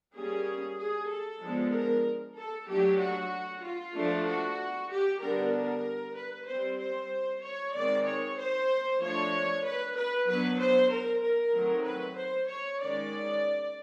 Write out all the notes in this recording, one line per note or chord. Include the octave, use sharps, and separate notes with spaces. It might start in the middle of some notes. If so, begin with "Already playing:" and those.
G3 A#3 C#4 G#4
G#4
A4
F3 G#3 B3 D4
A#4
A4
F#3 A3 D4 G4
F#4
F4
F3 A3 D4
F#4
G4
D3 G3 B3 D4 A#4
A#4
B4
G3 C4 C5
C5
C#5
D#3 G#3 C4 D5
C#5
C5
F3 A3 D4 C#5
B4
B4
F#3 B3 D4 B4
C5
A#4
A#4
D#3 F#3 A3 C4
B4
C5
C#5
D#3 G#3 C#4 D5